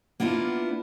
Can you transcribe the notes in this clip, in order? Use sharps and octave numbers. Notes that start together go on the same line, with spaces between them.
A#3 B3 D4 E4 F4